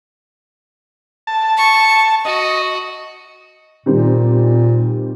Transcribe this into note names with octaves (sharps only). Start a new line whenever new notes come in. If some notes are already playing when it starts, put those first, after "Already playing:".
A5
C#6
F#4 D#5
A#2 D#3 G3 C4